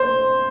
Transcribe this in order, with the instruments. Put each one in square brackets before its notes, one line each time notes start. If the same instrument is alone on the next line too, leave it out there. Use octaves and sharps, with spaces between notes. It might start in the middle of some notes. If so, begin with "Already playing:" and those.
Already playing: [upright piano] C5